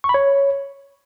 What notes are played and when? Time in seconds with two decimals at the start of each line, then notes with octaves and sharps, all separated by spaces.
0.04 C#6
0.09 B5
0.14 C#5